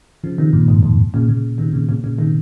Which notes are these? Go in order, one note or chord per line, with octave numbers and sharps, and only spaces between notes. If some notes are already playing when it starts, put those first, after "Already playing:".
C#3 F3
C3 D#3
G2 A#2
F2 G#2
F2 G#2
A#2 C#3
A#2 C#3
C3 D#3
A#2 C#3
A#2 C#3
A#2 C#3
C3 D#3